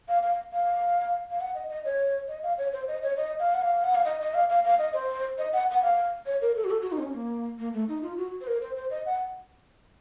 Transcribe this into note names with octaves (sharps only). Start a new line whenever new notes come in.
F5
F5
F5
F5
F#5
D#5
D#5
C#5
D#5
F5
C#5
C5
D#5
C#5
D#5
F5
F#5
F5
F#5
F5
D#5
D#5
F5
F5
F5
D#5
C5
D#5
F#5
F#5
F5
C#5
A#4
A4
F#4
A4
F#4
D#4
C4
C#4
A#3
A#3
A3
D#4
F4
F#4
C5
A#4
C5
C5
D#5
F#5